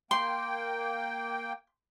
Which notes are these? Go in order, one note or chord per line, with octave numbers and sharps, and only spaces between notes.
A#3 G5 C6